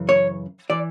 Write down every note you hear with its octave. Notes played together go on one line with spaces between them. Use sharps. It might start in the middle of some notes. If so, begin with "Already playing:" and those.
Already playing: F#2 C#3 E3
C#5
E3 D5